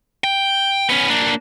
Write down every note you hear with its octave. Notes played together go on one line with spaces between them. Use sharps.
G5
B3 C#4
A#3 D4